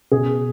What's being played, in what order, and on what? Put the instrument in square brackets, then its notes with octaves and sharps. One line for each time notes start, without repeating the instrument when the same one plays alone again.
[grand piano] B2 G#4